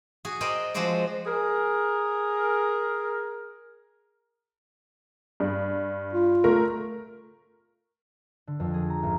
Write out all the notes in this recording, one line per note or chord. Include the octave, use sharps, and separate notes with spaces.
F#4 G#4
A#4 C5 D5 D#5 G5 C6
F3 G#3 C4 F#4 C5 D5
G#4 A#4
G2
F4
A3 A#4
D3
F2
G#4
A#5
G#1